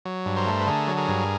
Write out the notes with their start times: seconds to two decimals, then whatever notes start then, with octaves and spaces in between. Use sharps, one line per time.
0.05 F#3
0.26 G2
0.37 A#4 C5
0.46 A3
0.60 B4
0.67 D3 G#4 A#4
0.88 F#3
0.97 G#4 A#4
1.08 G2